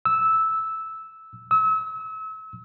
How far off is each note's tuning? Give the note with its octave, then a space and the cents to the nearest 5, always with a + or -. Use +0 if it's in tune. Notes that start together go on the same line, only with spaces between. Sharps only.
E6 -10
E6 -35